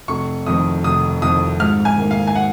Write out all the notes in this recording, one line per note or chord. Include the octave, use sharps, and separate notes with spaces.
F1 C#6
F2 D#3 D#6
F1 D#6
F2 D#3 D#6
G#2 F6
G#5
D#3 A#3
F5
G#5
F#5